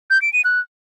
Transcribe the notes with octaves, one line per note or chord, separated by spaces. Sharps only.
G6
D7
D#7
F#6